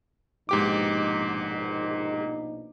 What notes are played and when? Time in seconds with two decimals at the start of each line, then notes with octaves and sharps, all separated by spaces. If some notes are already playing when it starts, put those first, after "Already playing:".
0.49 A#1 G#2 B2 D#4 G4 D6